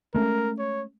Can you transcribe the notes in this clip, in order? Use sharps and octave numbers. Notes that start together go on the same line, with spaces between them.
G#3 A3 C#4 A#4
C#5